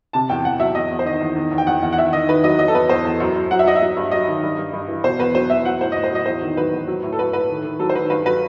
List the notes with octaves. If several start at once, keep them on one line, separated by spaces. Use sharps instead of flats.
C3 A5
E2 G5
E2 F#5
F#3 E5
E2 D#5
E2
C5
D#3 D#5
E2
D#3
E2
G5
E2 F#5
E2
F#5
D#3 E5
D#3 D#5
D#3 B4
F#3 D#5
F#3 D#5
A4
E2 B4
E2 C5
E2
F#2
F#2
F#3 F#5
E5
F#3 D#5
E5
F#3
G2
F#3 D#5
D#3
G2
G2
G2
E3
B2 C5
E2 B4
F#3 C5
E2 E5
F#3 F#5
A2 C5
A2 D#5
C5
F#3 D#5
E2 C5
D#3
F#3 B4
E2
F#3
A2
A4
F#3 B4
A2 B4
D#3
D#3
F#3 A4
C5
D#3 B4
G2 B4
F#3 B4